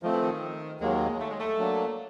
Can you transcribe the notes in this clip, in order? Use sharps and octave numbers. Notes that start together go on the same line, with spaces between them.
D#3 F3 A3 C4
E3
D#3
D#2 D#3 F#3 G#3 A#3
A3
G#3
A3
F#3 A#3 D4